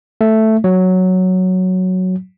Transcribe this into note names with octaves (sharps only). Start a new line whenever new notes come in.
A3
F#3